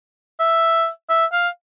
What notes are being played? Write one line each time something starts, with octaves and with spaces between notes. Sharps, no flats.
E5
E5
F5